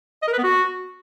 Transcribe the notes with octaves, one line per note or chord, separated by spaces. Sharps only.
D#5
A#4
B4
B3
F#4